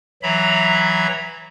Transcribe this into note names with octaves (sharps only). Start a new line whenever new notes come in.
E3 F#3 E5 A#5 B5